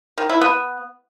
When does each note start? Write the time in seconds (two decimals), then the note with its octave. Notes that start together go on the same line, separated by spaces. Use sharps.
0.18 D#3
0.29 E4
0.41 B3